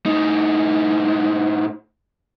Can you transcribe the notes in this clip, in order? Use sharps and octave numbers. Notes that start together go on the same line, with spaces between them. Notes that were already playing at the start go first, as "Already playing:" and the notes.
A2 D#4